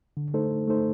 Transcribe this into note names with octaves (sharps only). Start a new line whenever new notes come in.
D3
A3 D#4 A4 C5
D3
A3 D#4 A4 C5